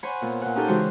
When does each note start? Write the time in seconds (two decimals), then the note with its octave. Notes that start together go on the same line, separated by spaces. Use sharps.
0.03 C5 C#5 F#5 G#5 B5
0.22 A#2 B3
0.42 A#2 F#5
0.55 C#4 D#4 G4 A4 F5 G5
0.67 C#3 E3 G#3 F#4 C5 C#5